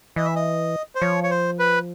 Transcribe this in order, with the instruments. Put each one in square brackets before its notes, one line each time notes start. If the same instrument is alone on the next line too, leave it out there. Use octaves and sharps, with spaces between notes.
[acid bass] E3 [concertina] D#5
[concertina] E5
D#5
C5
[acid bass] F3 [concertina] C#5
[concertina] C#5
C5
B4